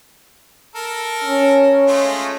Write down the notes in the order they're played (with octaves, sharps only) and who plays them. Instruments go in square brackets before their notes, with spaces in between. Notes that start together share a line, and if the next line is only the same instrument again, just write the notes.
[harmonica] A4 A#4
[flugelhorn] C#4
[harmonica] G#3 A3 F4